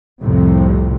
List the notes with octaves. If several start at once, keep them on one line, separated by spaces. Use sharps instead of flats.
C2 F2 A2 C3